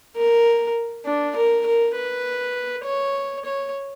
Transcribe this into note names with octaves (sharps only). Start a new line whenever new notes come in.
A#4
D4
A#4
A#4
B4
C#5
C#5